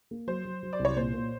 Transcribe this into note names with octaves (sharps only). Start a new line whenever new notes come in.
A#3
F#3 C5
F#3
F#3
D5
C2
C#5
A#2 C5
A#2